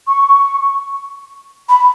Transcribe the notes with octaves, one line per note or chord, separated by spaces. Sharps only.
C#6
B5